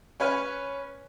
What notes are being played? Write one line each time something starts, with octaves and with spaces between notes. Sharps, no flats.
C#4 B4 C#5 G#5 F6